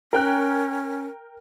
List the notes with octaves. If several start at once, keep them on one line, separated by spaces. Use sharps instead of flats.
C#4 A#4 G5 F#6